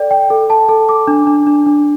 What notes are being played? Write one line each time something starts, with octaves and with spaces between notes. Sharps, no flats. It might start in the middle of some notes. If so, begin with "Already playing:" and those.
Already playing: A4 D5 G5
G5
A4
A5
A4
D6
D4
D4
D4
D4